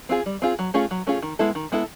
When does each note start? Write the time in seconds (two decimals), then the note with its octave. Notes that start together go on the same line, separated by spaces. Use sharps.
0.09 C4 F4 G#4
0.26 G3
0.42 C4 F4 G#4
0.59 F#3
0.74 A3 C#4 F4 G#4
0.91 F#3
1.07 A3 C#4 F4 G#4
1.22 D#3
1.39 G#3 B3 E4 A4
1.55 D#3
1.72 G#3 B3 E4 A4